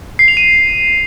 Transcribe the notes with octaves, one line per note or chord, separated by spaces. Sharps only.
C7
F7
D#7